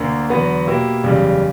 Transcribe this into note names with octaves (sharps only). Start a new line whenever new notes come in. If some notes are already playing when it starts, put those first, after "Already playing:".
Already playing: D2 D3 A#3
E2 D3 F#3 B3 F#4
B2 A#3 E4 G4
F#1 E2 C#3 G3